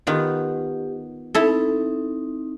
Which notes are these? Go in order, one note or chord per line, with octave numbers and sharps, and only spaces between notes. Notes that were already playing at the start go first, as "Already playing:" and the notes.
D#3 B3 F4 G4
C4 D#4 E4 A4